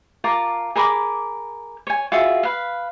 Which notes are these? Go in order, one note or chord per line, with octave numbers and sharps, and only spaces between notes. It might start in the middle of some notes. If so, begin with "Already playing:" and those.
F4 A#4 A5 D6
G#4 A#4 B5 D6
C#5 G#5
F4 F#4 G#4 E5
B4 F5